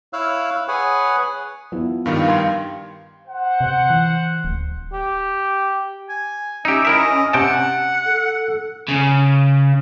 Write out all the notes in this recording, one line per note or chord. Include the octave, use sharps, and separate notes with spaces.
E4 C#5 F5 E6 F#6
G#4 B4 C#5 F#5 G#5
F3 B3 E4
G2 D#3 G3 F5
G5 C6 G#6
C5 F#5
C3
E3
D1
G4
G#5
C#4 D#4 G4 E5
E4 A#4 D#5 E5
C3 F#5 G5 A5
A4
C#3